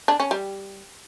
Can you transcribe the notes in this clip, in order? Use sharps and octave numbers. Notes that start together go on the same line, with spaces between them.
D4
C#4
G3